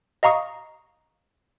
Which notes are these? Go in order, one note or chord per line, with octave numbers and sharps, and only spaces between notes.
D#5 F5 A#5 C#6 D#6